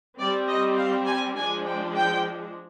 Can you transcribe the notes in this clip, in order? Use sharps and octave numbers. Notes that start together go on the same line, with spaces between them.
G3 C4 D5
D#5
F5
G#5
F3 G#3 D4 G#5
G5
G5